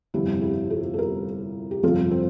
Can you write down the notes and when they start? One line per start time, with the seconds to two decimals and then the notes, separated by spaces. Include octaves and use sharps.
0.14 G1 F2 C3 E4 G4
0.42 E4 G4
0.70 F4 A4
0.94 A4
0.98 G4 A#4
1.71 G4
1.83 G1 F2 C3 F3 F4 A4
2.11 C4